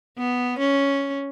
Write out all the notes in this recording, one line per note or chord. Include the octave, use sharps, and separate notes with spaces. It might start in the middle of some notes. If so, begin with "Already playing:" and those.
B3
C#4